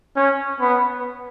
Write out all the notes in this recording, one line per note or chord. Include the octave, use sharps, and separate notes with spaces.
C#4
B3